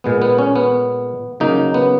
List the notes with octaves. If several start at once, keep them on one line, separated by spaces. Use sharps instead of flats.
A#2 G#3 B3
B3
C#4
B3
C#3 F#3 A#3 D#4
B3